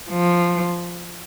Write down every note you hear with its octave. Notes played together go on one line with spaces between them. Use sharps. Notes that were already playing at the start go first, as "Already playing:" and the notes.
F3